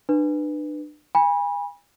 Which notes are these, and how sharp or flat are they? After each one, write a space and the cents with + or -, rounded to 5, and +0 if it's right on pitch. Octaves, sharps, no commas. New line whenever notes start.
D4 +35 B4 +0
G#5 -35 B5 -25